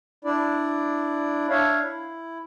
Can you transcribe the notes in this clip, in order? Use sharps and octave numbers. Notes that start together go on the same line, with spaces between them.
D4 E4 D5
D4 C#5 E5 F5
E4